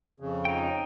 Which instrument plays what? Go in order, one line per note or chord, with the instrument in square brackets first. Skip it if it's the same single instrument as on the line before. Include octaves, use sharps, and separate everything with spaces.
[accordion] F2 C#3
[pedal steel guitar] D#4 G5